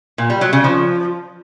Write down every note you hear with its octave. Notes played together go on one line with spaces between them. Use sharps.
A#2
G3
F#3
C#3
F3